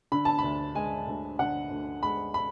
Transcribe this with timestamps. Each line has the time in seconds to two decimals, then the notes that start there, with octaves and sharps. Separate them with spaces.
0.12 D3 B5
0.25 A5
0.39 D2 B5
0.75 G#3 G#5
1.07 D2
1.39 D3 F#5
1.71 D2
2.03 G#3 B5
2.34 B5